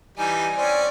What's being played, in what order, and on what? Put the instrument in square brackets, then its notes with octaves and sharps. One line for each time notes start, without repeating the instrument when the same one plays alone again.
[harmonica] E3 G3 D#4 [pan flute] G#5
[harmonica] C4 C#4 [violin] D5